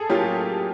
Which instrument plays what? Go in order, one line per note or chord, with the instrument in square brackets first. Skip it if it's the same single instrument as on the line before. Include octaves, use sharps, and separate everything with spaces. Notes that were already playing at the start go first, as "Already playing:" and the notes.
Already playing: [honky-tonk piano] G#4 A4
[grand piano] A2 F#3 A#3 C#4 F4 [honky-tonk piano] G4